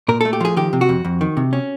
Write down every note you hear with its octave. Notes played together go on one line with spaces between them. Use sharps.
A#2 A#4
A3 A4
G4
F3 G#4
D#3 G4
C3
F#4
F2
F2
D#3
C3
C#4